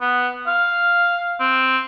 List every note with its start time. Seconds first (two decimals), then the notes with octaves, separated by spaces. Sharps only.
0.01 B3
0.47 F5
1.40 C4